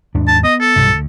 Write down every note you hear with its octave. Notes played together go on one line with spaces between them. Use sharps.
D#2 G#2 D4
A5
B3 D#5
A4
B1 G2 C3
D2